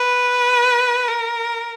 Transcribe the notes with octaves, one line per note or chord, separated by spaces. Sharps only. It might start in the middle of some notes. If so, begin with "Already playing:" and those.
Already playing: B4
A#4